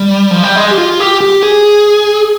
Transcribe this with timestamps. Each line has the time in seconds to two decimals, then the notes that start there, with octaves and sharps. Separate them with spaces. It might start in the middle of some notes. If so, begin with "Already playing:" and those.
Already playing: G3
0.31 F3
0.43 G3
0.56 G#3
0.71 G4
0.77 F4
1.00 G4
1.21 G4
1.43 G#4